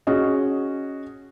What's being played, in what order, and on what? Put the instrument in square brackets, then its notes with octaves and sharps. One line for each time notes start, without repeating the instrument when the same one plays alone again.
[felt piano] C#4 F#4 G#4 D#5